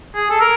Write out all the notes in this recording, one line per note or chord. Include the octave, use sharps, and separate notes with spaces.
G#4
A4
A#4